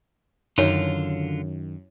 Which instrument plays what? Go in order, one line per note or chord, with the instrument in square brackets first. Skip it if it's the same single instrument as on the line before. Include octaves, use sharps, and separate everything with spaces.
[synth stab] F#2 [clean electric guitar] D3 F4 [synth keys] D#3 [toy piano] E4 C#5